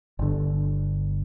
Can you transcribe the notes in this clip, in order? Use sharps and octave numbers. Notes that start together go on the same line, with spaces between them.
G1 D3